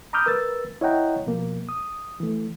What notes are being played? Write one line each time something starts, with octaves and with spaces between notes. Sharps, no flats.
A#5 B5 D6 D#6 F6 G6
A#4 B4 E6 A6
E4 C#5 D#5 F#5 G5 A#5
B2 F3 A#3
D#6
E3 A3